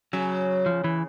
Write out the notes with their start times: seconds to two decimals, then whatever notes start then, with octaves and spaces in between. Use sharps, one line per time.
0.13 C#3 F#3 C#4
0.66 F3
0.84 E3